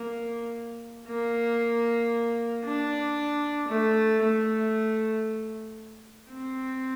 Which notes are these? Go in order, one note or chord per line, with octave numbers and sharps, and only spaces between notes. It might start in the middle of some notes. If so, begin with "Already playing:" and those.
Already playing: A#3
A#3
D4
A3
A3
C4